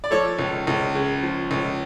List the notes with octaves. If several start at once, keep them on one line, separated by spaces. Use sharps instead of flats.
D5
F3 A4 C#5
C#2
C#2
C#3
F3
C#2